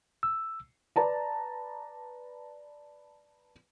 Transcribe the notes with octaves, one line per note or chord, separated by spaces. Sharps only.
E6
B4 D5 A5 A#5